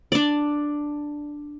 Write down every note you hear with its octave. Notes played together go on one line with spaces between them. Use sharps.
D4 D5